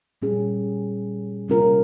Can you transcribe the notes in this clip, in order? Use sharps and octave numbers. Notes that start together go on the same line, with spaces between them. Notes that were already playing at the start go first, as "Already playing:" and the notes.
A#2 G3 C#4 G#4
C3 G3 C#4 F4 A#4